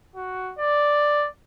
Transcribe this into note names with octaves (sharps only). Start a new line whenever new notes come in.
F#4
D5